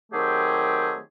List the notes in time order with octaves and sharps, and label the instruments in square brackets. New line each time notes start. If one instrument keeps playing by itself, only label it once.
[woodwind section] D#3 F#3 A3 C4 G4 G#4